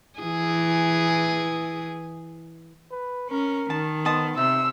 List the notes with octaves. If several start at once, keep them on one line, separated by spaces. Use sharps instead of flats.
E3 G#4
B4
C#4 A#4
D#3 A5
B3 C5 D#5 A5
C3 D#4 E5 E6